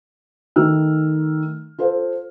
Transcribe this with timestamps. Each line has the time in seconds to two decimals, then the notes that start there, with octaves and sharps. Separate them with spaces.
0.56 D#3 A3 E6 F6
1.79 F4 A4 C5 F5